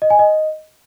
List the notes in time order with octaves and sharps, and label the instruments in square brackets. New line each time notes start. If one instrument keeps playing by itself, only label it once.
[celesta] D#5
G#5
D#5